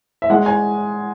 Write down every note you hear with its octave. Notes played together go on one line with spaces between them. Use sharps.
E5
G#3 F#5
G#5